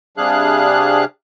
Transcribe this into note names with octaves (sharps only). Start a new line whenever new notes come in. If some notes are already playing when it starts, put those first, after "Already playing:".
C3 G3 D4 G#4 F5 F#6